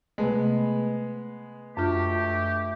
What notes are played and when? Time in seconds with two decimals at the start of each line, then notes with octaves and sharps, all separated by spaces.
0.18 C3 G#3 A3 B3
1.77 F#2 A3 D4 F4 G4